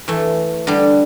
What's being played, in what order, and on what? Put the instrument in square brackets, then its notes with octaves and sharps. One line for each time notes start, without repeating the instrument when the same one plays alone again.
[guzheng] E3 A3
D3 G3